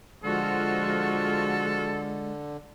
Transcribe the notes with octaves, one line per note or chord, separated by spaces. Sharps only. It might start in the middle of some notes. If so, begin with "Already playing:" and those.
D3 F3 G#3 F4 F#4 A4